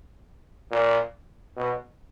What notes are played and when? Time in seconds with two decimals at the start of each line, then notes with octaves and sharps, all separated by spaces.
0.71 A#2
1.57 B2